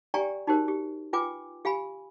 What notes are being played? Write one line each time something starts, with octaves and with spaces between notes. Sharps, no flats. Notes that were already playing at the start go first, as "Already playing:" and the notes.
G4 D5 G5 G#5 A#5 C#6
D#4 F#4 G4 A#4 C5
G4
F4 B4 G5 G#5 D6
G4 F5 G#5 B5